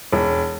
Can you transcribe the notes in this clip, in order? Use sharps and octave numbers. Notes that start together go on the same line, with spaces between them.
E1